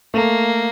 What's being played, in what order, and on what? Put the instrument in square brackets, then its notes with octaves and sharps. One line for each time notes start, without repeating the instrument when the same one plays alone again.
[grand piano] A3 [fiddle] A#3